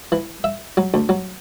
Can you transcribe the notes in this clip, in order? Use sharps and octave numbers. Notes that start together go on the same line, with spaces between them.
E3
E5
F#3
D2
F#3